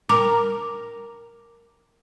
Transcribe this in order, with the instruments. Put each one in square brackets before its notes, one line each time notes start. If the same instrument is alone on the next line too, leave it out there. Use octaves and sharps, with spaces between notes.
[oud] A#4 [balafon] D6